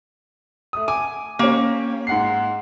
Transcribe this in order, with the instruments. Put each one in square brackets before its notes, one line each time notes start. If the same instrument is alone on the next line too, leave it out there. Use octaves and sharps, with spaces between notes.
[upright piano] A3 D#6
[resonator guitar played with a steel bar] G#5 [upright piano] D6
[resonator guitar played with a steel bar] A#3 [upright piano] C#4 G4
[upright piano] G#2 F#5 C7